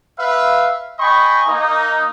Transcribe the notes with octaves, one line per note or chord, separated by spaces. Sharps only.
B4 E5 F5
D#5 G5 G#5 B5 C#6
A#3 D#4